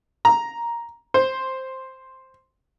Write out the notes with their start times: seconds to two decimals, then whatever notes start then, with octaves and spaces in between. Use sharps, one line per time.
0.25 A#5
1.14 C5